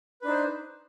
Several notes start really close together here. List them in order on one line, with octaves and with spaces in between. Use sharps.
B4 D4 D#4 C5